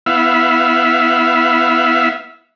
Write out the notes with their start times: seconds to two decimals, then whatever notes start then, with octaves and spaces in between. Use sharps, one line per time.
0.06 B3 E4 E5 F5